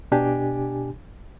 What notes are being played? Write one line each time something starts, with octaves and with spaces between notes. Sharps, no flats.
B2 D4 G4 G#5